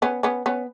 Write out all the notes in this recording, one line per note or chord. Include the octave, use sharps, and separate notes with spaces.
B3 C#4
B3 C#4
B3 C#4